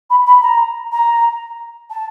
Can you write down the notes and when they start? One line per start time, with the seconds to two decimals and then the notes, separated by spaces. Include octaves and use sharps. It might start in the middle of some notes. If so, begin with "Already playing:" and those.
0.10 B5
0.26 B5
0.42 A#5
0.92 A#5
1.90 A5